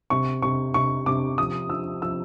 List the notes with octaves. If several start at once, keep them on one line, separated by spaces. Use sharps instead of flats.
C3 C#6
C3 C#6
C3 C#6
C3 D6
F3 D#6
F3 E6
F3 E6